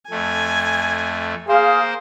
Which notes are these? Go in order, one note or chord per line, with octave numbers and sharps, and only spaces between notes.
F2 A3 G#5
A#3 G#4 C5 F5